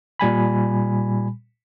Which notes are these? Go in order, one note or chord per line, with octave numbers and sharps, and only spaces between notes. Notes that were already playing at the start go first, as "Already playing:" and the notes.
A#2 G3 G#5 B5